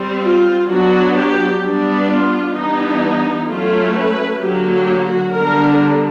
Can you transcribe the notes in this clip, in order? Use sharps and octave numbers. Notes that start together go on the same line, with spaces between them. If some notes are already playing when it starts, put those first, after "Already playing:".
Already playing: G3 C4
F4
F#3 B3 D4 F#4
G4
G3 B3 D4
F4
E3 G3 B3 D4 D#4
F#3 A3 C#4 F4
B4
D3 F#3 A#3 G4
G4
F#4
D3 G3 B3 D4 A#4